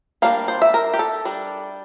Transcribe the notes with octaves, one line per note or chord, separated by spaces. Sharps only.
G3 A#3 D4 F5
C5
E5
A#4
G4
A4
G3 D4